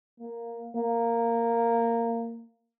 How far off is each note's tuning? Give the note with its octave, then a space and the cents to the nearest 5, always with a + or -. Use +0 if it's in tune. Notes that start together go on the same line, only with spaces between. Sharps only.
A#3 +0
A#3 -10